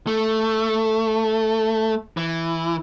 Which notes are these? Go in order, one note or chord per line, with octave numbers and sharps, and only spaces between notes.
A3
E3